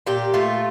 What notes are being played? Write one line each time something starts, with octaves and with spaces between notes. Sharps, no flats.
A#2 G4
A3 F4